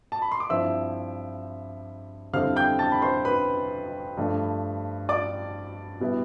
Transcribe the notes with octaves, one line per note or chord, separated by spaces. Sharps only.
A5
B5
C6
D6
G2 F3 C4 E4 E5 E6
F2 D3 G3 C4 E4 F5 F6
G5 G6
A5 A6
B5
C5 C6
B4 B5
G2 F3 A3
D5 D6
B2 G3 B3 E4